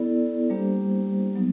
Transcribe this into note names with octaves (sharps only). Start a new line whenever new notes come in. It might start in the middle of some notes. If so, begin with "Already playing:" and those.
Already playing: B3 E4 A4 D5
G3 A#3 D4 G4 C5
F#3 B3 D#4